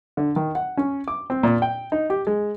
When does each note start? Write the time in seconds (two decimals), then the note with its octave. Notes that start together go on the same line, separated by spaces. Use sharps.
0.17 D3
0.36 D#3
0.55 F#5
0.77 C#4
1.08 D6
1.30 C4
1.43 A#2
1.62 G5
1.92 D#4
2.10 G4
2.27 G#3